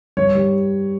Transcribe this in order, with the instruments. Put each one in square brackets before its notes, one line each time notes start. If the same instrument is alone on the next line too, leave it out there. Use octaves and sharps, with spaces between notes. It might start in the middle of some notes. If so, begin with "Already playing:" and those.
[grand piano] G2 C#5
G3